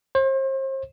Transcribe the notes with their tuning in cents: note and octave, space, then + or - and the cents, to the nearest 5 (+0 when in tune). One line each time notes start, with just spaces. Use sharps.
C5 +40